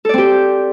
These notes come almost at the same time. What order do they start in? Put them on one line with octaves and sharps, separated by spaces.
A4 D5 C4 G4